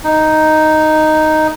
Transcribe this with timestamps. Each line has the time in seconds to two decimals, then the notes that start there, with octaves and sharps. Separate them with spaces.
0.04 D#4